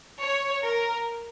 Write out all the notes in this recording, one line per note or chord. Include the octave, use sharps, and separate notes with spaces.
C#5
A#4